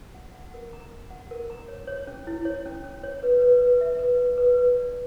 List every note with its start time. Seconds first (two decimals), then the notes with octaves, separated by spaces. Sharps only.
0.14 F#5
0.34 F#5
0.54 A#4
0.73 A#5
0.92 A#5
1.10 F#5
1.31 A#4
1.50 A#5
1.68 C#5
1.87 C#5
2.07 C#4
2.27 E4
2.45 C#5
2.66 C#4
2.84 C#4
3.03 C#5
3.23 B4
3.42 B4
3.62 B4
3.81 E5
3.99 B4
4.19 B4
4.38 B4
4.58 B4
4.77 D5